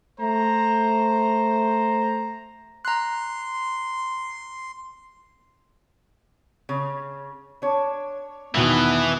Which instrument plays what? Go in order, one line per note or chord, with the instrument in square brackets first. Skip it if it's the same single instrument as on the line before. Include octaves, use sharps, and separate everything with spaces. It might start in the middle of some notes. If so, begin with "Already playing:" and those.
[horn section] A3 C5 A#5
[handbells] A#5 F#6 [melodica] C6
[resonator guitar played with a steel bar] C#3
D4 C#5
[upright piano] E2 B2 D#3 [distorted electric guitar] E3 [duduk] B3